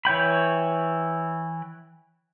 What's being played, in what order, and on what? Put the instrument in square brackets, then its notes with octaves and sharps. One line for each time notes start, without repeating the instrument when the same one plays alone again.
[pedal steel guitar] E3 C#5 G5 B5